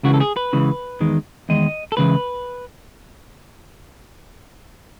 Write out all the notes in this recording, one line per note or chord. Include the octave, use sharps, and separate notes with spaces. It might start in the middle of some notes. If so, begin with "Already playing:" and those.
C#2 C#3 E3 F#4
A4
G#4
B4
C#2 C#3 E3
E2 D#3 G#3
E2 D#3 G#3 D#5
A4
C#2 C#3 E3 B4